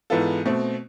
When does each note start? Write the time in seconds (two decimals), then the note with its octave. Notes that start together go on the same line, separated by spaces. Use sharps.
0.10 G#2 E3 B3 F4 A4
0.46 B2 A3 C4